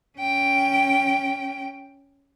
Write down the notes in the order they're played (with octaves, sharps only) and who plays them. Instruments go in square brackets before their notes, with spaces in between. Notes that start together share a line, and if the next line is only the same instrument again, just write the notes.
[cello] C#4 G5